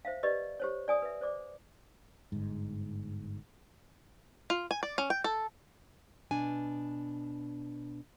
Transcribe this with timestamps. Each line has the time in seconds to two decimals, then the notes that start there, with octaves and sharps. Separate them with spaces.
0.05 C5 E5 F5
0.23 G4 B4 D5 D#5
0.60 G4 C5 C#5
0.88 D5 G#5 D#6
1.02 B4 E5
1.21 C5 D5 D6
2.32 G1 G#2
4.50 F4
4.71 G#5
4.83 D5
4.98 C#4
5.10 G5
5.24 A4
6.31 B2 D4 G#5